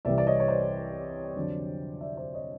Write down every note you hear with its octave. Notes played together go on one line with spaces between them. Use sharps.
C2 C3 E3 G3 D5 E5
D5
C#5 D#5
C#5
C5 D5
F2 D3 F#3
D5 E5
C5 D5
C#5 D#5